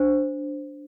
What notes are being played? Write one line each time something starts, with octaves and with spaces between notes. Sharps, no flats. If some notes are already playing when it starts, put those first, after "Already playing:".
Already playing: D4 C5